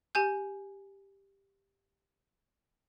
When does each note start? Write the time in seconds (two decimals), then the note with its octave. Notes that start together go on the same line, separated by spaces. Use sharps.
0.15 G4 G#5 G6